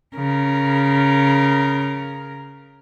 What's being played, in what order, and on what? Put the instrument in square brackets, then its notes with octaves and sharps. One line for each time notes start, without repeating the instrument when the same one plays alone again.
[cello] C#3 A#4